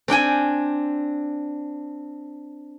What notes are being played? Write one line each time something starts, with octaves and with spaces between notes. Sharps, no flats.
C4 D4 G5 G#5